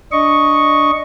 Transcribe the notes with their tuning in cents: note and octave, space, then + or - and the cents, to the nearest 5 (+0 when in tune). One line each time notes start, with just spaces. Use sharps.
D4 +0 D#5 +0 C#6 +0